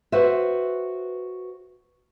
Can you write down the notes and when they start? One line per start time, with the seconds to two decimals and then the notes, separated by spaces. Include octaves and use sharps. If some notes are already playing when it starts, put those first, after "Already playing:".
0.12 F#4 B4 C5 E5